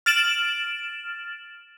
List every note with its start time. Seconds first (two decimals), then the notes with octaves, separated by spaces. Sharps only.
0.06 F6 A6 D7 E7 F#7